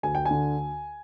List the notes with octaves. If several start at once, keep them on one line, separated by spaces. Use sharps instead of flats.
D2 G#5
G5
G#5
D3